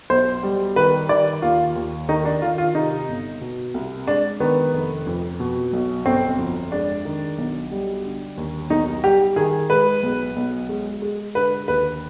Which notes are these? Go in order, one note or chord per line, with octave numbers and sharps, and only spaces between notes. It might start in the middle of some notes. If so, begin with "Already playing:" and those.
B1 C5
G3
D#3 B4
D#3 D5
D#2 F4
D#2
D#3 D#4
D4
D#3 F4
F4
C3 D#4
G1
B2
C2
G#3 D4
D#3 B3
F1
F2
B2
B1
G1 C4
F2
G#3 D4
D#3
B1
G3
D3
D#2
B1 D#4
G3 G4
D#3 G#4
G#3 B4
B1
B1
G#3
G#3
D3 B4
D#2 B4